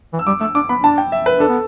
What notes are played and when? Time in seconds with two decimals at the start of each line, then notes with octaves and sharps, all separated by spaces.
0.13 E3
0.19 E6
0.27 G3 D6
0.41 A3 E6
0.55 D4 D6
0.69 B3 B5
0.83 D4 A5
0.98 G5
1.12 E5
1.26 B4
1.40 D4 A4
1.49 B3